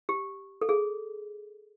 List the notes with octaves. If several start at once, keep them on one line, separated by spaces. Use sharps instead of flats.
G4
A4
G#4